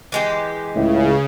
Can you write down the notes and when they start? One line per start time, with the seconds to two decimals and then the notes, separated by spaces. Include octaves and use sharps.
0.12 E3 G#3 G4
0.76 C#2 A2 C#3